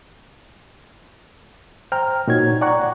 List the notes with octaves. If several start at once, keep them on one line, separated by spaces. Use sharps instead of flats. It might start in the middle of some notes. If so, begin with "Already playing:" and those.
C5 G5 A#5 F6
A#2 D#4 F#4 C#5 G#6
D5 F#5 G5 A#5 C#6 F#6